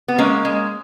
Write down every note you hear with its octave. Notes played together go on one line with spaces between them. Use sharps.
B3
G#3 A#3 C#4
G#3